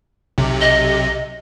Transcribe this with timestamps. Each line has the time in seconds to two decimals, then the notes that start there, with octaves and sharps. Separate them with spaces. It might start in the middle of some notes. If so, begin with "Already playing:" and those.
0.38 B1 C3
0.61 D#5